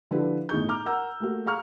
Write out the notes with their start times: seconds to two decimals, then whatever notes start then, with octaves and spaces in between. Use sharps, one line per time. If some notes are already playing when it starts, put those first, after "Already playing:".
0.11 D3 F3 D4 E4 G4 B4
0.49 G1 A2 D#4 G#4 C#6 G6
0.69 A#5 D6 F6
0.86 A#4 F#5 A#5 E6 G6
1.20 A3 A#3 F#4
1.46 G#4 F5 A#5 C#6 F6